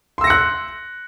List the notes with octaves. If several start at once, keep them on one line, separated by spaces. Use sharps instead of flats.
C6 E6 F#6 A#6 C#7